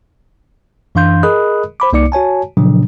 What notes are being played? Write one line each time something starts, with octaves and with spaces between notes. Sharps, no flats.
F#2 E3 D4 F5 C6 G6
G#4 A#4 D#5 B5 D#6 F#6
C5 B5 D6
C2 A#3 D#4 D5 D6 C#7
F#4 C#5 G#5 A5
A#2 C#3 F3 F#3 D4